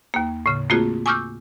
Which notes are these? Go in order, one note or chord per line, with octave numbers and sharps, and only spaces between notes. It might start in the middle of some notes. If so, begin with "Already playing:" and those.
D#2 A#3
A2 C#3
A3 A#3 C4 F4 F#4 G#4
G#5 C#6 D6 E6 F6 G6